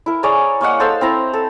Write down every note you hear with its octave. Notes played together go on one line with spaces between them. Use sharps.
E4 A#4
G#4 C#5 D5 A#5
A#3 C#5 D#5 F#5
A4 C5 F5 E6
C4 E4 A#5
A4